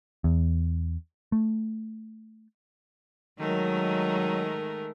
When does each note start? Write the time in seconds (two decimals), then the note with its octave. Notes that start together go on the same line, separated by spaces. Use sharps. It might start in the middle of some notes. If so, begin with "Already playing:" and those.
0.24 E2
1.32 A3
3.39 D#3 F#3 G#3 A3 A#4